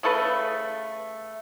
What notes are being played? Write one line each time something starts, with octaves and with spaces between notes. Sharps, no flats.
C#3 A3 A4 B4